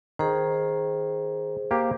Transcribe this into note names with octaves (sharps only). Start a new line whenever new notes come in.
D#3 G#4 C5
A#3 G4 C5